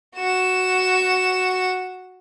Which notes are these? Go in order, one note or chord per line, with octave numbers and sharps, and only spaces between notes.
F#4 E7